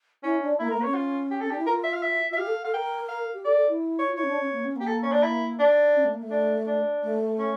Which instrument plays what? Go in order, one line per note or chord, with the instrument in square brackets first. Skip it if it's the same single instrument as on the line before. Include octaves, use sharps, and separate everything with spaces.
[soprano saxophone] C#4 [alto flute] E4
[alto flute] D4
[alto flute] A#3 [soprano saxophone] E4
[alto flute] A3
[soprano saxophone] A#4
[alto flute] A#3
[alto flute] C#4 [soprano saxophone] C#5
[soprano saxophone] F4
G4
[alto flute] C#4 [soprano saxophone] A4
[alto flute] D4 [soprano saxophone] G4
[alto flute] E4
[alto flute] F4 [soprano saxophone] A#4
[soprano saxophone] E5
F5
E5
[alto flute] F4
[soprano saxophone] E5
[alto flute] G4 [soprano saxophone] F5
[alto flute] A4
[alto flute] A4 [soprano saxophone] F5
[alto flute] A#4 [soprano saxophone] G5
[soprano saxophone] F5
[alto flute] G4
[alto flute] A4 [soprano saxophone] D5
[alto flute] A4
E4
[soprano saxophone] C#5
[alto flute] F4
[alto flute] E4 [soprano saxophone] C#5
[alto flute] C#4
D4
C#4
A#3
C#4
[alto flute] A#3 [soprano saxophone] G4
[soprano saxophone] A4
C#4
D4
E4
D4
[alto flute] C#4
A3
A#3
A3
[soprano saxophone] D4
D4
[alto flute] A3
[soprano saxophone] C#4